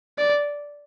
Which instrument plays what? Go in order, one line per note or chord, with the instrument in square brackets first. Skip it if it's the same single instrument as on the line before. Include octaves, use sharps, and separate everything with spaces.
[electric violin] D5